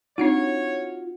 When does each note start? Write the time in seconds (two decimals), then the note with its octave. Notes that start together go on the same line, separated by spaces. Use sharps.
0.18 C4 D4 D#4 F4 F#4 C#5